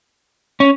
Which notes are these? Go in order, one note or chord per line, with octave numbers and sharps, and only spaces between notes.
C#4